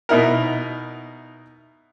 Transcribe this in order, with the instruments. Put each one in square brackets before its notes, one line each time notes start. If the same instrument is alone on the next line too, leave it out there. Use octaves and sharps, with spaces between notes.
[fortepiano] B2 D#4 E4 A#4